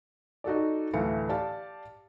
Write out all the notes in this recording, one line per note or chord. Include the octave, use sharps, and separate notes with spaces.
D#4 F#4 A4 D5
D2 A2 E3 A3 F5 C#7
G4 D5 F5 A5